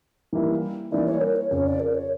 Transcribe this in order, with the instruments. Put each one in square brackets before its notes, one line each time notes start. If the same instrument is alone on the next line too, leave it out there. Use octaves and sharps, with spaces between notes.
[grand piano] E3 G3 A#3 E4
[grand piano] E3 G3 A#3 E4 [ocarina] D5
[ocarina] C#5
A#4
C#5
[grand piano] F2 C#3 F3 C#4 [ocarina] C#5
[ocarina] D5
A#4
C#5